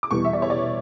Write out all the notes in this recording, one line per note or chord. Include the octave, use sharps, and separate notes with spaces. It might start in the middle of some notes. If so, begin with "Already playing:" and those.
D6
E2 B2 G3 B3 C#6
E5
D5
C#5
D5